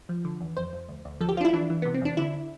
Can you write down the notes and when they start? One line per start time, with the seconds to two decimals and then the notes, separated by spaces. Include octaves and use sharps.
0.09 F3
0.25 D3
0.41 E2
0.57 F2 C5
0.73 F2
0.89 D2
1.05 D2
1.21 F3 A4
1.29 G4
1.37 F3 F4
1.41 D4
1.45 E4
1.53 E3 D4
1.70 E3
1.82 C3 B3
1.94 C4
2.01 E2 D4
2.17 D3 E4